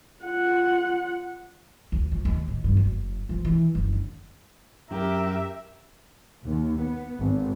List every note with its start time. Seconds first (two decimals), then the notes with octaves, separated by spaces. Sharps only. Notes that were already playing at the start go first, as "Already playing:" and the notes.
0.23 F4 F#5
1.92 D2
2.12 F2
2.25 D#2
2.48 A2
2.64 G2
2.77 F#1
3.29 F3
3.45 E3
3.75 F#1
3.93 D3
4.91 F#2 G4 A#4 E5
6.43 D#2
6.77 B3
7.20 G#1